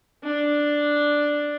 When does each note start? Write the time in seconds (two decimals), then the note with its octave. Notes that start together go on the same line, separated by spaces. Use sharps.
0.24 D4